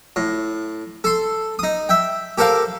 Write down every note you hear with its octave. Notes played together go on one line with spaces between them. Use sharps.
A2
A4 C6
D#4 D#6
E5 G5
G4 A4 A#4 C5 F5